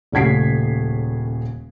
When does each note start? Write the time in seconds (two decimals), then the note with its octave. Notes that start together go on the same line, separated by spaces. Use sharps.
0.12 D#1 C#3 A3 G#6 B6 C7